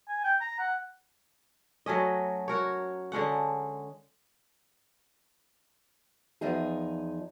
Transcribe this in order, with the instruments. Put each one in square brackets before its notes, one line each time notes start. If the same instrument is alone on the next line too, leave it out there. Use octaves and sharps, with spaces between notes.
[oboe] G#5
G5
A#5
F#5
[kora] F#3 A3 C#4 D#5
F#4 A#4 C#5
D3 G#3 C#4 F#5
[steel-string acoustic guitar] E2 F3 D#4 G#4